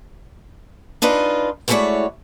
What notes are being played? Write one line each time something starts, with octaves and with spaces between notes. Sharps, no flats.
D4 D#4 F4 B4 D#5
G#3 A3 E4 F#4 C#5 D5